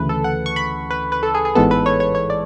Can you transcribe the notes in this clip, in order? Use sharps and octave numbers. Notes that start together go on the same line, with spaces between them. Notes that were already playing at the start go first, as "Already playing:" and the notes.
Already playing: D2 C#3 E3 A3 B4
A4
F#5
C#6
B5
B4
B4
A4
G#4
G#4
A1 G#2 E3 G#3 B3 A4
B4
C#5
C#5
C#5
D5